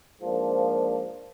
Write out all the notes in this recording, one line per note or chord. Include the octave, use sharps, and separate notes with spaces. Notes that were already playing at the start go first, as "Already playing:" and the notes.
G#2 F3 A#3 D4